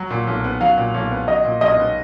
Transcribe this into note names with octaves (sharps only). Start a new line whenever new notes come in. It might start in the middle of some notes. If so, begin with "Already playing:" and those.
Already playing: F#3
A#2
B1
B3
F#3 F5
A#2
B1
B3
F#3 D#5
A#2
B1 D#5
B3